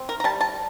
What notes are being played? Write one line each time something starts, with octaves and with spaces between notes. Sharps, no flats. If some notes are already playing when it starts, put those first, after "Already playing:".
Already playing: C4
A#4
A#5
G3 A5
A5